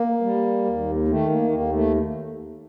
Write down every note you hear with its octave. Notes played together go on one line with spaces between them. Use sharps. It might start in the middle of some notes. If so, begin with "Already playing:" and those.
Already playing: A#3
G3
D#2
D#3 A3
A#3
D#2 A#3
A3